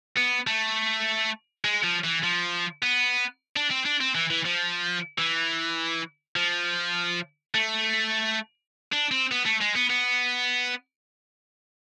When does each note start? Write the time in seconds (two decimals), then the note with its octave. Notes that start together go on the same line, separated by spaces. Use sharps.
0.17 B3
0.47 A3
1.64 G#3
1.84 F3
2.04 E3
2.23 F3
2.83 B3
3.56 D4
3.71 C4
3.85 D4
4.01 C4
4.15 E3
4.30 E3
4.45 F3
5.18 E3
6.36 F3
7.54 A3
8.92 D4
9.11 C4
9.31 B3
9.46 A3
9.61 G#3
9.76 B3
9.90 B3